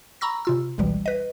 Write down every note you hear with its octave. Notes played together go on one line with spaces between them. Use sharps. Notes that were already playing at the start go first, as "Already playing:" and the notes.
A#5 B5 C#6 E6 A#6
C3 F4 E6
G#1 C#2 B2 E3 G3
B4 D#5